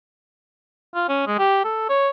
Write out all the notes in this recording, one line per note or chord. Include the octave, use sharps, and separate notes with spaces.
F4
C#4
G#3
G4
A4
C#5